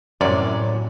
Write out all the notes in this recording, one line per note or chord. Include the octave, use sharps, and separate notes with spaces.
F#2 A2 C3 F#3 C#4 D5